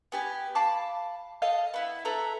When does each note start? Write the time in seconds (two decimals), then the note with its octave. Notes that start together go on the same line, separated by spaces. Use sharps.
0.12 B3 G4 G#5
0.55 F5 A5 B5 D6
1.42 A4 D#5 F5
1.74 B3 E4
2.05 A4 B4 E5 A#5